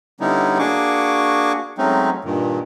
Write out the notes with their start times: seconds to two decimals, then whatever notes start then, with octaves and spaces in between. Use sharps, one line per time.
0.20 D3 G3 B3 C#4 D#4 E4
0.59 A#3 D4 F#4 G#4 C#6 D6
1.78 F#3 G#3 A3 C4 C#4 D#4
2.25 G2 A#2 D#3